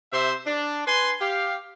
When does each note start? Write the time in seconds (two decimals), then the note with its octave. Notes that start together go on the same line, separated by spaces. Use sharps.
0.13 C3 C5 E5 C6
0.47 D4
0.87 B4 G#5 C6
1.21 G4 F5